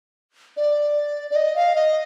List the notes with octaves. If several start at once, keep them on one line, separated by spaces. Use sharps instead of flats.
D5
D5
D#5
F5
D#5